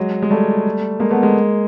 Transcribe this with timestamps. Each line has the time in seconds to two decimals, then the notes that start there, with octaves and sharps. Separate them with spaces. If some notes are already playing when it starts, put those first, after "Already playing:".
Already playing: F#3 G#3
0.22 G#3
0.31 G3 A3
1.00 G#3 A#3
1.11 A3 B3
1.22 G#3 A#3